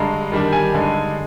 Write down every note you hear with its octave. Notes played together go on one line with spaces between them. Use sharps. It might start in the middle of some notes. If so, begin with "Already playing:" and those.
Already playing: G2 D3 G#3 A#5
D#3 G3 D4
G#5
G2 D3 G#3 D#4